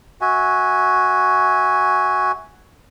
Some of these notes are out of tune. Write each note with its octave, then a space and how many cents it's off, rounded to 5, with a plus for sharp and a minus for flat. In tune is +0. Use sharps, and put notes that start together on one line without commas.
F#4 +0 E5 -25 G#5 +0